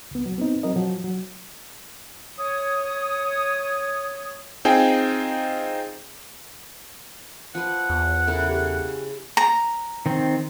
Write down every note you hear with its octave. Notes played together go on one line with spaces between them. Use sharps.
C#2 B3
F#3
B3 C4 D#4
F#3 C4 A#4 D#5
F3 F#3
F#3
C#5 D#6
C4 D#4 F4 G#4 G5 G#5
F3 B4 F#5
E2
C#3 E4 A4 A#4
G4 G#4
A#5
D#3 C4